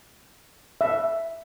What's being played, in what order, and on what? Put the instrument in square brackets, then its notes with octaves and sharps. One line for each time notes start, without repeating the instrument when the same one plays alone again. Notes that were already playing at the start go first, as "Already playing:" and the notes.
[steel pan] E5